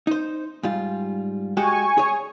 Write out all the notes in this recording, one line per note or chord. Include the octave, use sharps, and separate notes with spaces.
D#4 C5
G#2 G3 F4
G#3 F#4 G4 G#5 C#6
G#4 C#5